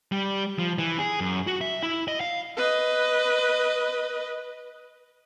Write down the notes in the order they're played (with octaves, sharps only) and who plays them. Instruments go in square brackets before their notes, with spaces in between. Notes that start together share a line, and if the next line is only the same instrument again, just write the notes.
[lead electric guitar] G3
F3
E3
G#4
F#2
F#4
E5
E4
D#5
F5
[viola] B4 D#5